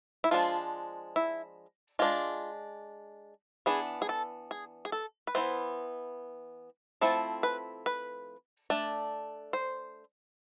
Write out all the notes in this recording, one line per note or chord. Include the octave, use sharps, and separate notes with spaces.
E4
F3 G#3 D4 F4
E4
G#3 D4 F4
E3 B3 D4 G#4
G#4
A4
G#4
G#4
A4
B4
E3 B3 E4 C5
F3 A3 C4 E4 A4
B4
B4
A3 D4
C5